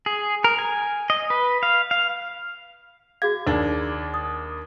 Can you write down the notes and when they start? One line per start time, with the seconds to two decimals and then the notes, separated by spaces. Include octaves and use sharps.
0.06 G#4
0.44 A#4
0.59 G#5
1.10 D#5
1.30 B4
1.63 F5
1.91 F5
3.22 F#4 G#4 F5 G#6
3.47 D#2 D4
4.14 D#6